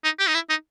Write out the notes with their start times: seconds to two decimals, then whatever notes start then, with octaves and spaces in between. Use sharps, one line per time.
0.04 D#4
0.19 G4
0.27 D#4
0.34 E4
0.49 D#4